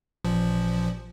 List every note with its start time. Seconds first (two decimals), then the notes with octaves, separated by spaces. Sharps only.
0.24 A1 A#2 F3